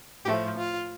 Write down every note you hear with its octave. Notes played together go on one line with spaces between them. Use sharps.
A2 F3 A3 G4
F4